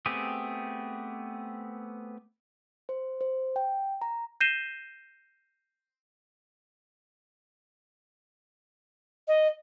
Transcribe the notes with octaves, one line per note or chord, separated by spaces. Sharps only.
A3 B3 C4 G4 G#4
C5
C5
G5
A#5
G6 A#6 C7 D#7 E7 G7
D#5